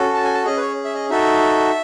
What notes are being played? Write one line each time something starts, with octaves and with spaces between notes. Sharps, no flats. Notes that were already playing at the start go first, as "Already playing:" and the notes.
Already playing: C#4 F#4 A4
A5
G#5
A5
C#4 G#4 D#5
B4
C#5
E5
D#5
D#4 F#4 A4 E5